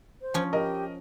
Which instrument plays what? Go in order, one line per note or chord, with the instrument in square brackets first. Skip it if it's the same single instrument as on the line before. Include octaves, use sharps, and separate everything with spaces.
[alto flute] C5
[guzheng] F3 C#4
[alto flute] G4 [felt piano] A#4 D#5